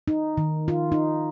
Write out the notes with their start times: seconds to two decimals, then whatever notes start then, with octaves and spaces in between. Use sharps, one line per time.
0.08 D#4
0.37 D#3
0.68 F4
0.92 D#4